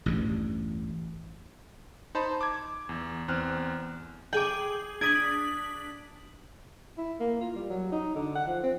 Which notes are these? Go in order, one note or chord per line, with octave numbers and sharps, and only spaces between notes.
A1 E2 G2
D#4 C5 A5 B5
D6 G#6
E2
E2 C4 F6 F#6
G#4 G5 D6 F#7
D4 D#6 G#6 B6 F#7
E4
A#3
F4
G3
F#3
D#4
D3
F#5
F3
C4